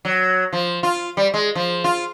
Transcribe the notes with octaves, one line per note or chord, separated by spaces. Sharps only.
F#3
F3
F4
G3
G#3
F3
F4